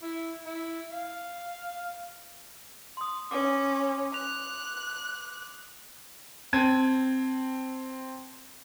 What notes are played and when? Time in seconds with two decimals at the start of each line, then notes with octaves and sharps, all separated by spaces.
0.03 E4
0.45 E4
0.92 F5
2.97 C6 D#6
3.31 C#4 D6
4.14 F#6 F7
6.53 C4 A5 G#6 D#7